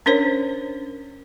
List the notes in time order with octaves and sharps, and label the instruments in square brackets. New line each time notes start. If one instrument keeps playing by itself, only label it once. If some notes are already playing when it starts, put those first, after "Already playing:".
[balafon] C#4 D4 A#4 C5 C#5